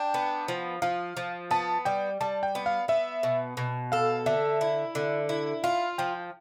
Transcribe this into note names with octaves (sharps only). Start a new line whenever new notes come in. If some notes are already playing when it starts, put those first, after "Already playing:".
Already playing: D4 G5
B3
F3
F3 F5
F3
B3 A5
G3 G5
G3 A5
G5
B3
F5
B3 E5
B2
B2
A4 F5
D3 E5
E4
D3
E4
F4 F5
F3 G5